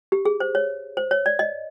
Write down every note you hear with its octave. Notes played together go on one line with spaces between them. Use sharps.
G4
G#4
C5
C#5
C5
C#5
D5
D#5